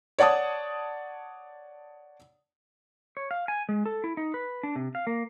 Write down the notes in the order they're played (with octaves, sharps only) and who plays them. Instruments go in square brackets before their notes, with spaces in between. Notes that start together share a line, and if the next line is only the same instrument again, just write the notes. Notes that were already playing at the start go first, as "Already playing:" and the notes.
[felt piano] C#5 D5 F#5 A5 D#6
[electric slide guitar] C#5
F5
G#5
G#3
A4
E4
D#4
B4
D4
C3
F5
A#3